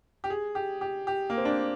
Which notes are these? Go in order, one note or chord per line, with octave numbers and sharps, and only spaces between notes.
G4
G#4
G4
G4
G4
A#3
C4
D4